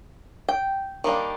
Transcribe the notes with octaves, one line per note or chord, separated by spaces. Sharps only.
G5
D#3 G3 A#3 D4